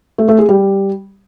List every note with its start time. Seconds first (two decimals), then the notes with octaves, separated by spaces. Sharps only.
0.18 A3
0.28 A3
0.39 G#4
0.49 G3